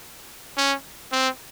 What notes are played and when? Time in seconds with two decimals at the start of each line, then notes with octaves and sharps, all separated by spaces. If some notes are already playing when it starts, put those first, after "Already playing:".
0.57 C#4
1.12 C4